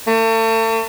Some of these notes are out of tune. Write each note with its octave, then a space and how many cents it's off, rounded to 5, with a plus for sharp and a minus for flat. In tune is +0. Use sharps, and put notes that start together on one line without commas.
A3 +40